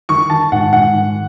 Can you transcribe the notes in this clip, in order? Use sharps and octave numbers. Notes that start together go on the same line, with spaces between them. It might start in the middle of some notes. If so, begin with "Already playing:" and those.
D#3 C#6
D#3 A5
G#2 F#5
G#2 F#5
D#3